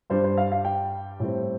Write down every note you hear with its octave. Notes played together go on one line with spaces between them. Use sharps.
G2 G3 D4 C5
C5
F5
F5
G5
A2 G3 C4